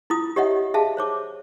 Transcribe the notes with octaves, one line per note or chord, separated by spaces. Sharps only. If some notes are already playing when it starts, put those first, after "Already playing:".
E4 F4 D#6
G4 C#5 D#5 E5 F#5
G#4 E5 F5 A5
C5 C#5 D6